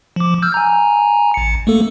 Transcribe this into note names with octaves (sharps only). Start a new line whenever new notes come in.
F3 D6
E6 F6 G6
G#5 A#5
A1 C#7
A3 A#3 A4